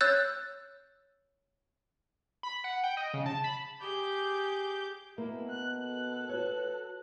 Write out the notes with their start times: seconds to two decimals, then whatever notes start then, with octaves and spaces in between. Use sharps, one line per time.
0.01 C#5 E6 F#6 G6 A6
2.43 B5
2.64 F#5
2.84 G5
2.97 D#5
3.14 C#3
3.26 A5
3.44 B5
3.81 G4 G#4 D6 G6
5.18 B2 A#3 E4
5.49 F#6
5.83 A4 F#6
6.29 F#4 B4 C#5